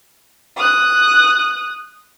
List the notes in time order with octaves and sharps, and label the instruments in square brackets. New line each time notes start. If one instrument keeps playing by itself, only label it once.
[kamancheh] D#6 F#6